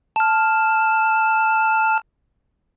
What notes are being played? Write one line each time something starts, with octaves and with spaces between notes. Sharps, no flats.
A5 F6